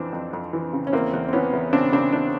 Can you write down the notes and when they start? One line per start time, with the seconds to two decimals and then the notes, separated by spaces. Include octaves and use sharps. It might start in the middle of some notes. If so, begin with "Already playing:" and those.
Already playing: F2 E3 C4 D4
0.13 F2
0.33 F2
0.53 E3
0.73 C#3
0.87 C#4
0.93 E2 A#3 C4
1.13 E2
1.28 C4
1.33 E3 B3 C#4
1.53 E2
1.73 C#3 C4 D4
1.92 C#3 C4 D4
2.13 E2 C4 D4